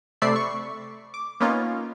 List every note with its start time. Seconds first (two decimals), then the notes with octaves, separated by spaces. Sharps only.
0.22 C3 A3 D5 E5 B5 C7
0.36 C#6
1.14 D6
1.40 A#3 B3 C#4 D#4 F4